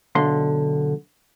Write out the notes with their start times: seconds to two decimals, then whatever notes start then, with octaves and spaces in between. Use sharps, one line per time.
0.15 B1 D3 C6